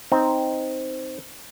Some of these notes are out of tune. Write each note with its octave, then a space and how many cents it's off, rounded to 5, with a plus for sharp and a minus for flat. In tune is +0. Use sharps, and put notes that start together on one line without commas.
C4 +0 D#4 +0